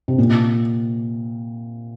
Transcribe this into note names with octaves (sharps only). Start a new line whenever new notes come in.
C3
A#2